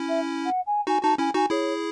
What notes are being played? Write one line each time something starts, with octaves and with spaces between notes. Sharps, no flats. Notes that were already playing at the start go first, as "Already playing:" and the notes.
Already playing: C#4 E4
E5
F#5
G#5
D#4 F#4 G#5
D#4 F#4 A5
C#4 E4 G#5
D#4 F#4 G#5
E4 G#4 C#5